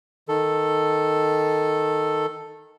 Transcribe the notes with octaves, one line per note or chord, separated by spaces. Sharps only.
D#3 A4